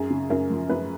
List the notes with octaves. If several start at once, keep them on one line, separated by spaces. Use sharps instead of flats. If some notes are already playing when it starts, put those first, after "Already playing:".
Already playing: F#2 G#4
C#3
F#2 A#4
F3
F#2 B4